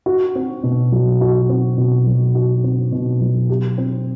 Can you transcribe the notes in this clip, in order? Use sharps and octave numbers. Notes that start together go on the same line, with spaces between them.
F#4
C4
B2
F#3
F#4
C4
B2
F#3
F#4
C4
B2
F#3
G4
C4